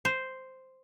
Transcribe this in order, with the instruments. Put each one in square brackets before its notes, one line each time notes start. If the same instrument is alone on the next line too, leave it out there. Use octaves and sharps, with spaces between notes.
[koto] C5